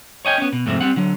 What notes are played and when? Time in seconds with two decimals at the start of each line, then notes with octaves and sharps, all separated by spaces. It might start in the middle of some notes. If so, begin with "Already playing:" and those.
0.25 C#5 D#5 G5 G#5
0.38 B3 C#4
0.53 B2
0.66 F2 G#2 C3 A3 C4
0.81 G3 C4 F#5
0.96 D3 F#3